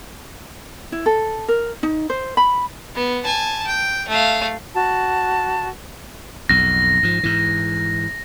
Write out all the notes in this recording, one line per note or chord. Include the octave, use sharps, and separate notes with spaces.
E4
A4
A#4
D#4
C5
B5
B3
G#5 A5
G5
A3 F5
F#4 A5
B1 F2 A#6
G#2 F3
G#2 E3